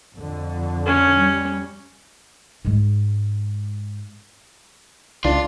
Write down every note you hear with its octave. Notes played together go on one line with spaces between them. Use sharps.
F2 D3
C#4
G3
G#2 G#3
C#2 D4 F4 D5